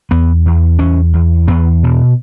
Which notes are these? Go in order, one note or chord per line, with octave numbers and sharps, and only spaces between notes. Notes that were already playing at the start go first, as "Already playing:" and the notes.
E2 B3
E2
E2 C#4
E2
E2 B3
B2